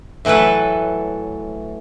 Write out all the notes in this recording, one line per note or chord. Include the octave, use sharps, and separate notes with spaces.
A2 E3 F#3 A4 B4